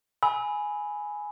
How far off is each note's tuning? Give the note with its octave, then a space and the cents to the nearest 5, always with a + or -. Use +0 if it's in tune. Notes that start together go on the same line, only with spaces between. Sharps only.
G#5 +5 B5 +0 E6 -35